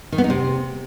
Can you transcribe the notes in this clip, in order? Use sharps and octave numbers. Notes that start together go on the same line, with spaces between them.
D#3
B3
D#4
C3